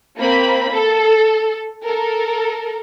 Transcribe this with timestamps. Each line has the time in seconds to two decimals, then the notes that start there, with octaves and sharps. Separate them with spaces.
0.17 A#3 C4 B5
0.73 A4
1.85 A4 A#4